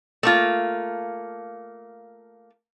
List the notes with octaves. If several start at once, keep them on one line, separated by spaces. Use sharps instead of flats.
A3 A#3 F4